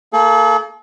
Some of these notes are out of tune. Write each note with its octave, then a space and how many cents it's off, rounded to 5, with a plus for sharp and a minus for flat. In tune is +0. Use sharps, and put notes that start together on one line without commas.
A#3 -25 A4 -45